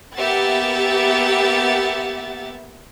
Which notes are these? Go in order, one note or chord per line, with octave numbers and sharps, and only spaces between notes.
A#3 B3 G4 E5 F#5 A6